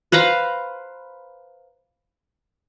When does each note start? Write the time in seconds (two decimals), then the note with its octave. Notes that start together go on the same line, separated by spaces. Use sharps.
0.12 B4 C5 F5 A#5